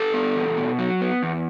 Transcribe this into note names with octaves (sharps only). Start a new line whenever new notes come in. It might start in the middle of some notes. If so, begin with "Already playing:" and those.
Already playing: G4 A4
B3
E2
B2
F#3
B3
E2